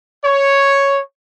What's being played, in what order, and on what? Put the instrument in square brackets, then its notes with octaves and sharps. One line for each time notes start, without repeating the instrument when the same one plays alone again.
[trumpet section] C#5